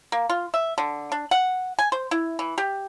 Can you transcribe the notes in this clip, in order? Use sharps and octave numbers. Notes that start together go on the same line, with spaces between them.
A#3
F4
E5
D3
D4
F#5
G#5
C5
E4
E3
G4